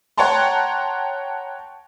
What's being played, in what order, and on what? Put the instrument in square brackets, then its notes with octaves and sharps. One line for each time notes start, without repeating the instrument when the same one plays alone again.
[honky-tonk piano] C#5 F#5 G5 A5 A#5 C6